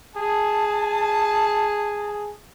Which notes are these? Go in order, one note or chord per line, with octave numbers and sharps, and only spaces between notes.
G#4 A5